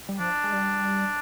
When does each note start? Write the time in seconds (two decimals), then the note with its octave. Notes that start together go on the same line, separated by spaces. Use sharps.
0.09 G3
0.19 F3 D4
0.44 G#3
0.53 G3